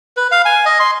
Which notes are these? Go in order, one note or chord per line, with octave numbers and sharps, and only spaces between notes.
B4
F5
G#5
D#5
C6